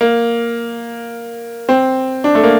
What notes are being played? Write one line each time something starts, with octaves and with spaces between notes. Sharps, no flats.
A#3
C4
D4
A3
A#3